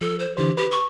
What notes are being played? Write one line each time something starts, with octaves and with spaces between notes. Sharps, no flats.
F3 A4
C5
D3 E3 G4 C5
G4 B4
C#6